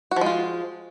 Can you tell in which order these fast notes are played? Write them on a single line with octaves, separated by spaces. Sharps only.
F#4 F3 G#3 F4